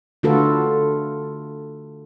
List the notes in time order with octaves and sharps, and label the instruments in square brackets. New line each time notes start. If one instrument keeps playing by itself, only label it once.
[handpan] D3 A3 F4 F#4 A4 B4